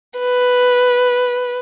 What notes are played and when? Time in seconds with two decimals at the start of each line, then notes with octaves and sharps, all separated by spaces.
0.19 B4